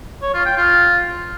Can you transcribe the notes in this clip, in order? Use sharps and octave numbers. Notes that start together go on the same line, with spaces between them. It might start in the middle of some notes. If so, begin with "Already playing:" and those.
C#5
F4
G5
F4